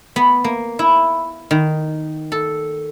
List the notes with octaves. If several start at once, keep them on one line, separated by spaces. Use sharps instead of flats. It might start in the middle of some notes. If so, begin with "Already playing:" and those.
B3
A#3
E4
D#3
A4